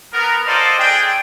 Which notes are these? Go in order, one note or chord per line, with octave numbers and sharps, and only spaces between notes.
B3 A#4
F4 A4 C5 D5 D#5
D4 G#4 G5